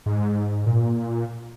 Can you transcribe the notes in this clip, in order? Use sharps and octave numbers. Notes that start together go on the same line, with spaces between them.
G#2
A#2